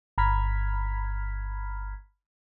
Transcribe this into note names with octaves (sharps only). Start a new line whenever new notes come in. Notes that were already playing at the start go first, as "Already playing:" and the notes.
G1 A#5 B5 F6 G#6 B6